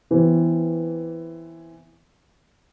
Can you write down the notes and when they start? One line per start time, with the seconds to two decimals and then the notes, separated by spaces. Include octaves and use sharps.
0.11 E3 B3 C4